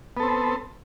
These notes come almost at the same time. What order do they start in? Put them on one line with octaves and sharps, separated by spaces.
B3 A4 C4